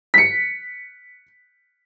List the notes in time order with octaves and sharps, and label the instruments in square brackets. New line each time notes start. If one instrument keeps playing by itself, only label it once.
[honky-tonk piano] B6 C#7